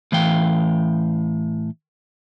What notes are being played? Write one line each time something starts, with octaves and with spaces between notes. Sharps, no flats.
A2 E3 F5 G5